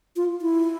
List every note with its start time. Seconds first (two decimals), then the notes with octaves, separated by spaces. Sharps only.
0.16 F4
0.42 E4